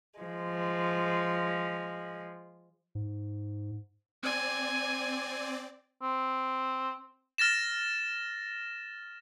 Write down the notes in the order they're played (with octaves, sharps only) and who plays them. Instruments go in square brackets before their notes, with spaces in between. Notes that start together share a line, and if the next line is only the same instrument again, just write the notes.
[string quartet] F3 G#3
[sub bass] G#2
[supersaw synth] C4 D5 [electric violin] G#5
[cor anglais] C4
[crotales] F6 A6 A#6 E7